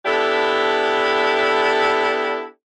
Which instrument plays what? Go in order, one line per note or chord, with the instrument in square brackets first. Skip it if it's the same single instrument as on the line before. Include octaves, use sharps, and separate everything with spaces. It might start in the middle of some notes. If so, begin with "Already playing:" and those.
[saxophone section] B3 D4 E4 G4 A4